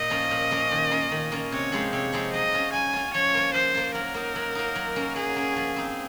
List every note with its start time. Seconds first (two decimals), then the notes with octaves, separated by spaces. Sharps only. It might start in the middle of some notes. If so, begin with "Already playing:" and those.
Already playing: A#2 D#4 D#5
0.10 F3 A#3 C#4 F4
0.31 A#2
0.51 F3 A#3 C#4 F4
0.71 D#3
0.91 A#3 C#4 F4
1.12 D#3
1.32 A#3 C#4 F4
1.52 C3 C#5
1.72 F3 G#3 C4 D#4
1.93 C3 C#5
2.12 F3 G#3 C4 D#4
2.33 F#3 D#5
2.54 C#4 F4
2.73 F#3 G#5
2.93 C#4 F4
3.14 F3 C#5
3.34 A#3 F4
3.54 F3 C5
3.75 A#3 F4
3.94 F#3 A#4
4.14 A#3 D#4
4.36 F#3
4.55 A#3 D#4
4.75 F#3
4.96 A#3 C#4
5.16 F#3 G#4
5.36 A#3 C#4
5.56 F3
5.76 C4 D#4